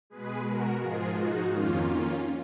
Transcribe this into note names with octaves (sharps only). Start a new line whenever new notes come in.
B2 G#3 G#4 B4
F#4 A#4
G#2 F3 G#3 F4 G#4
D#4 F#4
F2 D#3 A#3 C#4 F4
C#4 F4